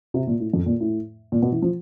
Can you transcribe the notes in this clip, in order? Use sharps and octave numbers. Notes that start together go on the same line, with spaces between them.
C3
A#2
A2
F2
A#2
A2
A#2
B2
E3
F3